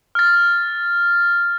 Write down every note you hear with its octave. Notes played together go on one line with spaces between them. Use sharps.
F6 A6